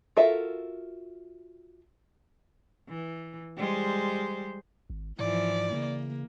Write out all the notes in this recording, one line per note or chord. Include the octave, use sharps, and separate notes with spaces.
F4 F#4 A4 A#4 E5
E3
G3 G#3 C5
G#1
G#2 E3 F3 D5
C#3 A#3